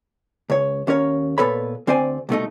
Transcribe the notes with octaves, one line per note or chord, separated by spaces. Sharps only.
C#2 C#5
D#2 C#4 A#4 C#5
A#2 B3 A4 B4 C#5 B5
D2 C4 C5 D5 G#5
C2 B2 A3 D#4